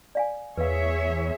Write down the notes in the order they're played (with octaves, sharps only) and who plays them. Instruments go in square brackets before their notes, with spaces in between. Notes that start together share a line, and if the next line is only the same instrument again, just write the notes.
[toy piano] D5 F5 G#5
[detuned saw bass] E2 [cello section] G#4 C#5 E5 [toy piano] B4 F5